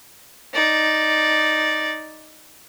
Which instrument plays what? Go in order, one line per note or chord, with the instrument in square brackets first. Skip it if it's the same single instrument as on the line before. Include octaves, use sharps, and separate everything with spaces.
[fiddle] D#4 D5